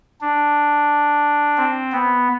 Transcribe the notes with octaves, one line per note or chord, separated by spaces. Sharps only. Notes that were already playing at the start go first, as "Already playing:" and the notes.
D4
C4
B3